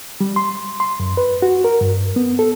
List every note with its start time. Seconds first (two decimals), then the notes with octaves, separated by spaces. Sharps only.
0.21 G3
0.36 C6
0.80 C6
1.00 F#2
1.17 B4
1.42 F#4
1.64 A#4
1.81 G2
2.16 B3
2.39 A4